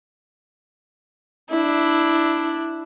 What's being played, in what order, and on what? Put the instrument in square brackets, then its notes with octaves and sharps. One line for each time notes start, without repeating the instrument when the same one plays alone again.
[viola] D4 E4